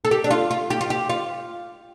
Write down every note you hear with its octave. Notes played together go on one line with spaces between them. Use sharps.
A4
G4
D4
F4
F4
G4
F4
G4
F4